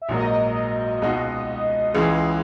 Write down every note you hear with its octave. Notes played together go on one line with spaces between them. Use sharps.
E5
A#1 G#2 F#3 A#3 D#5
C#2 B2 G#3 D#4 F#4
C#2 C#3 E3 G#3 G#4